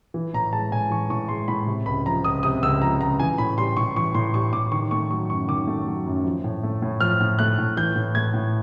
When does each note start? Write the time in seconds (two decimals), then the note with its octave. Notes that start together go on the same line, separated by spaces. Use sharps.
0.14 E3
0.34 A2 A#5
0.53 G#3 A5
0.71 A2 G#5
0.90 E3 C#6
1.10 A2 C#6
1.29 G#3 C6
1.48 A2 B5
1.67 C3
1.86 C#2 B5
2.06 F3 A#5
2.24 C#2 D#6
2.43 C3 D#6
2.63 C#2 E6
2.81 F3 A#5
3.01 C#2 A#5
3.20 E3 G#5
3.38 A2 B5
3.58 G3 C6
3.77 A2 C#6
3.96 E3 C#6
4.15 A2 C6
4.34 G3 C#6
4.53 A2 D6
4.72 D#3 C#6
4.91 A3 C#6
5.10 F#3 C#6
5.29 F#2 C#6
5.48 D#3 D6
5.67 A3
5.87 F#3
6.06 F#2
6.25 F3
6.44 A2
6.63 A3
6.82 A2
7.00 F3 F6
7.21 A2
7.39 A3 F#6
7.58 A2
7.77 E3 G6
7.96 A2
8.15 A3 G#6
8.34 A2